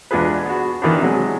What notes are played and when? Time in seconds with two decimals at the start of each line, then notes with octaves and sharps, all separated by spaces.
0.11 E2 G#3 D4 F4 G#4 B4
0.45 B3 F#4
0.82 D#3 E3 B3 D4
1.01 C3 F#3 G#3